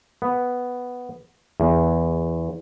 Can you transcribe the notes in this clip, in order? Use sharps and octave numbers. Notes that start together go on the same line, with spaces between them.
B3
E2